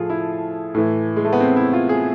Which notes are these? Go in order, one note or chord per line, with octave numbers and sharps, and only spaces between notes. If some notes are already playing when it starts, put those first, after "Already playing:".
Already playing: A2 F3 F4 G#4 A4
E4
A2 E3
G#3
A3
B3
C4
E4
F4
G#4